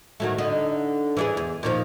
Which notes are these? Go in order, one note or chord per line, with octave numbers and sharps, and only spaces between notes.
D#3 F#3 A3
D3 D#4
E3 D4 G#4
E2
A#2 D#3 F3